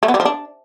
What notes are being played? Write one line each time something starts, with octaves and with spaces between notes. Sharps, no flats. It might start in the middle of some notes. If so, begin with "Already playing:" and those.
A3
B3
G3
F3
D4